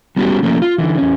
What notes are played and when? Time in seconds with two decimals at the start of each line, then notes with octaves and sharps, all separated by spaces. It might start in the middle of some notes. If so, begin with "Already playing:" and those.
0.16 G3 B3 C#4 D#4 F#4 G4
0.43 F3 A3 A#3 C#4
0.62 F4
0.78 D3 E3
0.98 E2 C#4